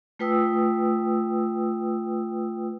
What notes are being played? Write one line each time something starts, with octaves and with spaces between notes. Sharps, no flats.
A3 F4 B4 G5 D#6 E6